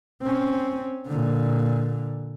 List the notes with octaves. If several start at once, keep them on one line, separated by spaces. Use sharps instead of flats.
C4 C#4
A#2 D3